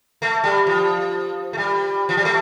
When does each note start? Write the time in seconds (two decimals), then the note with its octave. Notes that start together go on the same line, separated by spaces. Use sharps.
0.22 A3
0.44 G3
0.67 F3
1.53 A3
1.57 G3
2.09 F3
2.17 G3
2.25 A3